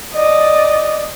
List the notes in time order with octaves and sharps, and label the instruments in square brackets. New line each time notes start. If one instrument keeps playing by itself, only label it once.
[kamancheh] D5 D#5